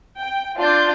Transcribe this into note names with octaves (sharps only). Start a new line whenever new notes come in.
G5
D4 F4 D5 C6 G6